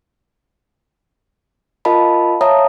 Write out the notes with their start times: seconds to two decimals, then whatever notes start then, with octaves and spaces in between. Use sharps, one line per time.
1.85 F4 A#4 D#5 F5 A5 B5
2.41 C#5 E5 F5 A5 A#5 D#6